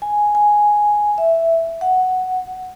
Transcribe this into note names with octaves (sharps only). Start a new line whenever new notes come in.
G#5
G#5
E5
F#5